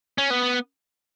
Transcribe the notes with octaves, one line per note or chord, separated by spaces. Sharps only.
C#4
B3